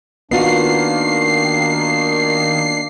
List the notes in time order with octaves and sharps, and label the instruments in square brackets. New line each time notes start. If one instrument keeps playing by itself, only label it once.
[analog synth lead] D#3 [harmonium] A#3 D4 [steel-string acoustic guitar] B3 F4 F#4 [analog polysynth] C7